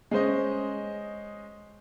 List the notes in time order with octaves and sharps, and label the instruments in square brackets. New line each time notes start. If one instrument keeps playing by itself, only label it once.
[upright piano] G#3 C#4 C5 D#5